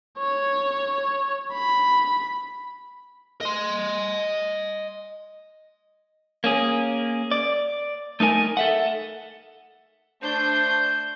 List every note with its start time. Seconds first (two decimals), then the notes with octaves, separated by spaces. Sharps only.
0.19 C#5
1.54 B5
3.41 D#5 C6
6.44 A#3 C#4 G#4
7.31 D5
8.20 A3 D#4 A#4 G#5
8.57 A4 E5 F#5
10.23 A3 D4 C5 G6